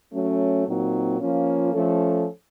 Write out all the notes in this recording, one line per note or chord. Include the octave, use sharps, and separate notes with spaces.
F#3 A3 C#4
A#2 F#3 C4 D#4
F3 A#3 C#4 F4
F3 A3 C#4 A4